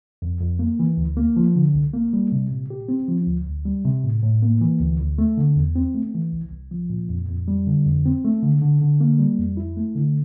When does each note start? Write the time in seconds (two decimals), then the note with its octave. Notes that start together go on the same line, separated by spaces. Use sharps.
0.22 F2
0.41 F2
0.59 A#3
0.79 E3
0.97 D2
1.17 A#3
1.37 F3
1.56 D3
1.74 C2
1.94 A#3
2.13 G3
2.32 C3
2.51 A#2
2.70 G4
2.89 C4
3.08 F3
3.27 D2
3.46 D2
3.65 G3
3.85 C3
4.04 A2
4.23 A2
4.43 A#3
4.61 E3
4.80 D2
5.00 D2
5.18 A3
5.38 D3
5.56 E2
5.76 C4
5.94 A3
6.14 E3
6.33 C2
6.52 C2
6.71 F3
6.90 A#2
7.09 F2
7.28 F2
7.48 G3
7.67 D3
7.86 F2
8.05 C4
8.25 A3
8.43 D3
8.62 D3
8.81 D3
9.01 A#3
9.19 G3
9.38 F2
9.57 E4
9.77 A3
9.96 D3